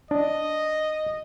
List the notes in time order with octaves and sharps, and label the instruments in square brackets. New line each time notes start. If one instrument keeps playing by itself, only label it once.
[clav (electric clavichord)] D4 [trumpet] D#5